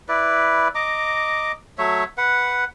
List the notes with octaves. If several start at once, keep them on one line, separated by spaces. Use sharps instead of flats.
E4 B4 D5
D#5 A#5 D6
F#3 A3 C#5 E5
B4 F#5